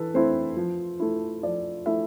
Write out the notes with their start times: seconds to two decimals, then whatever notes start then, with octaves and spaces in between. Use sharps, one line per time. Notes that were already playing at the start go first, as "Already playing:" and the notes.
Already playing: E3 A4 B4
0.14 A3 C4 E4 C5
0.57 F3
1.00 A3 E4
1.43 F3 D5
1.86 A3 E4 E5